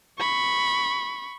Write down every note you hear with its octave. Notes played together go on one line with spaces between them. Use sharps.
B5 C#6